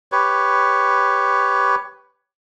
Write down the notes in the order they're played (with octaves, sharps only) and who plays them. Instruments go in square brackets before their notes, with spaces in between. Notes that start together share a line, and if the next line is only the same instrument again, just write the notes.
[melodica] G4 B4 C#5